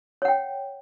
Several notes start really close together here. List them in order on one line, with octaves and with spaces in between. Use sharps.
C#5 F#5 G5